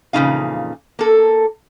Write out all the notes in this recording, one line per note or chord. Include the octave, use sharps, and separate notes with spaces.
F2 A#2 C#3 E3 D#4 F5
A#3 A4